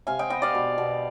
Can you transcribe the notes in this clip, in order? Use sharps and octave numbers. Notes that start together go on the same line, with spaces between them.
C3 F5 G#5
D#5 G5
B3 D#5 G5
D5 F5
B2
B2